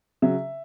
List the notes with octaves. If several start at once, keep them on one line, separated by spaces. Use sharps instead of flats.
C#3 F#3 E5